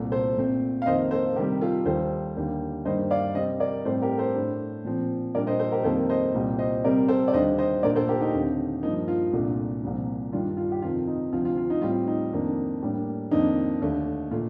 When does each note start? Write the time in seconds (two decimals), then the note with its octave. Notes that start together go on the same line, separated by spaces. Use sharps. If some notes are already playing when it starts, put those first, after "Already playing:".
Already playing: C2 A#2 A3
0.12 A4 C5
0.37 A#2 A3 C4
0.82 F5
0.86 F2 D#3 A#3 C5 D#5
1.11 A4 C5
1.36 C3 D#3 G3 G4 A#4
1.61 F4 A4
1.86 D#2 D#3 G3 A4 C5
2.37 D#2 D3 G3 A#3
2.85 G2 D#3 G3 A#3 C5 D#5
3.11 D5 F5
3.35 C3 G3 C4 C5 D#5
3.60 A#4 D5
3.85 A2 G3 C4 A4 C5
4.02 G4 A#4
4.18 A4 C5
4.35 A2 A3 D4
4.85 A#2 F3 C4
5.35 A#2 G3 D4 A#4 D5
5.47 C5 D#5
5.59 A4 C5
5.72 G4 A#4
5.84 F2 D#3 G3 A#3 A4 C5
6.10 C5 D#5
6.34 C2 A#2 G3
6.59 C5 D#5
6.84 C3 G3 C4 A#4 D5
7.08 A4 C5
7.28 D5
7.33 D#2 D3 G3 D4 C5 D#5
7.58 C5 D#5
7.83 A#2 A3 D4 A#4 D5
7.96 A4 C5
8.09 G4 A#4
8.21 D#4 G4
8.34 D#2 D3 A3 C4
8.83 G2 F3 A#3 D#4
9.08 F4
9.33 C2 A#2 A3 D4
9.83 C2 A#2 F3
10.33 G2 D#3 G3 D4 F4
10.57 F4
10.72 G4
10.82 F2 C3 D#3 F4
11.07 D#4
11.32 D2 C3 F3 C4 F4
11.45 F4
11.57 F4
11.70 D#4
11.81 A2 G3 C4 F4
12.07 D#4
12.32 F2 D#3 A#3 D4
12.82 A2 G3 A#3 D4
13.31 F2 D#3 A#3 D4 D#4
13.82 D#2 D3 A3 D4
14.31 A#2 A3 F4